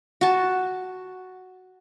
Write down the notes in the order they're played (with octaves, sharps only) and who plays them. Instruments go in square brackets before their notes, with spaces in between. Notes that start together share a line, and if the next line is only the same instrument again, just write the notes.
[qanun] F#4 A5